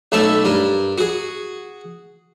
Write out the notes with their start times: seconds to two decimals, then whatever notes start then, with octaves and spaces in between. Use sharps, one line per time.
0.12 B1 A3 C#4 A4 E5
0.45 G2 A#4
0.98 F#4 G#4